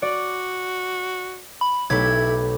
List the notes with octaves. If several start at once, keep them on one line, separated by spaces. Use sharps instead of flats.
F#4 D5
B5
B1 A3 E4 G4 B5 G#6